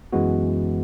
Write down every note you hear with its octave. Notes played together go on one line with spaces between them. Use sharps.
F#2 E3 G#3 B3 F#4